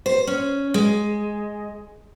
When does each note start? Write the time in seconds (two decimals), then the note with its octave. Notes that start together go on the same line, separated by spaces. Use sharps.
0.06 C5
0.27 C#4
0.74 G#3